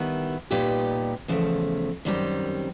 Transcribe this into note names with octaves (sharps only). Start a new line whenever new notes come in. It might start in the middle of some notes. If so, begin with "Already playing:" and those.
Already playing: D#3 G3 B3 E4
A#2 G3 B3 D#4 G4
E2 C#3 F3 A3
F#2 D#3 G3 C4